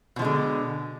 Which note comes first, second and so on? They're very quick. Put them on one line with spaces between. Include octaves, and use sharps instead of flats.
B2 F3 G#3 D3